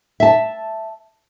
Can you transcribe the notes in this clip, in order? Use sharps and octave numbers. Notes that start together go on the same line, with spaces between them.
E5 A5